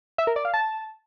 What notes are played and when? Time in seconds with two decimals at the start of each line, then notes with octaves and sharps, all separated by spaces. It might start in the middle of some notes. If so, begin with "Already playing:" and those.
0.18 E5
0.27 A#4
0.36 D5
0.45 F5
0.54 A5